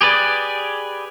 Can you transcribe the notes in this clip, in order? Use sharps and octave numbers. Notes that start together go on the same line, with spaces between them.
G4 G#4 B4 D5